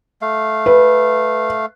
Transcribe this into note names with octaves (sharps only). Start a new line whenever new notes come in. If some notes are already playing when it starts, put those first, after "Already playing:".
A3 F5
B4